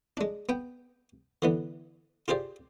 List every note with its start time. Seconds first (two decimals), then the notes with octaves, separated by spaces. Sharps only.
0.17 G#3 D4
0.49 B3 G5
1.42 D3 E3 B3
2.28 F4 G4 G#4 C5 D5